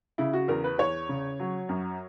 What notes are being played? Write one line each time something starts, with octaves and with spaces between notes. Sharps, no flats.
C#3 E4
F#4
E2 A#4
B4
E2 C#5
C#3
F#3
F#2